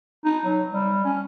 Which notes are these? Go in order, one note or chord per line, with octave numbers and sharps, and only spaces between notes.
D#4
F#3
G3
C#4